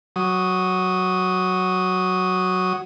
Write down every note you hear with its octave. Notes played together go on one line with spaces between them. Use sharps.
F#3 D#6